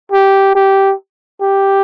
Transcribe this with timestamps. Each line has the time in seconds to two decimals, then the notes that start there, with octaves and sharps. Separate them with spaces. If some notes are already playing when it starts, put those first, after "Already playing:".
0.12 G4
0.55 G4
1.42 G4